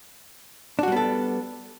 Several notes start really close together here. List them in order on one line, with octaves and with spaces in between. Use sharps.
D4 F#4 G3 B3 A4